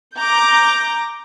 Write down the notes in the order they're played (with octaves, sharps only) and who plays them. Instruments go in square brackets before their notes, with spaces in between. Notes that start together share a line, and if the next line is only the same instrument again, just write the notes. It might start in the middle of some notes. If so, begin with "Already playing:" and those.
[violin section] A#5 D6 G6